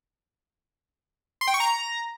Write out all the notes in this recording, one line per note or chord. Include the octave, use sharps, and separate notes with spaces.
C6
G5
C#6
A#5